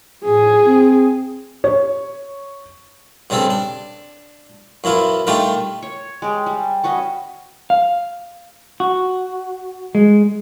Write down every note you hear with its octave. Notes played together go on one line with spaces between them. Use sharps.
A2 G#4
C4
C#5
G2 C#3 G3 C4 A4
D4
F#2 E3 E4 F4
D#3 G3 A3 D4 F4 G4
C#5
G#3 G4
G3
C#4 F#4 B4 D#5
F5
F#4
G#3